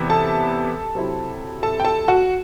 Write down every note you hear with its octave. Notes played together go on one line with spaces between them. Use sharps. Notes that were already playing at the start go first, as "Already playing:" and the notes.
Already playing: E2 C3 E3 B3 E4
A4 A5
C3 F#3 C4 E4
A4 A5
G5
A4 A5
F#4 F#5